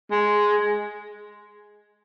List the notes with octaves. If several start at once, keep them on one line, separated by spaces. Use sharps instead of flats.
G#3